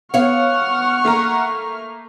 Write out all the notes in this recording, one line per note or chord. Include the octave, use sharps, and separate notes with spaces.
B3 C#5 F5 F#5 C#6 F6
A3 A#3 A#5